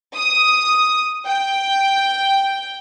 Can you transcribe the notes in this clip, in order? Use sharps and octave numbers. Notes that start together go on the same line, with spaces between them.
D#6
G5